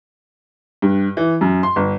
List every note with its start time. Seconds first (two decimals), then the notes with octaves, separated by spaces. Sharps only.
0.82 G2
1.17 E3
1.41 F#2
1.63 C6
1.76 G1